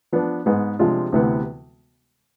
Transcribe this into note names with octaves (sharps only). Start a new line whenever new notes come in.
F3 B3 D4
G#2 G#3 B3
C3 F3 G#3 D4 F4
D2 C3 E3 B3